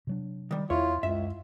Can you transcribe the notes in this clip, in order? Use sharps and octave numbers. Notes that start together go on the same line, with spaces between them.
C3 F#3 D4
D#3 G3
E2 E4 F4 C#5
C#2 F#2 E5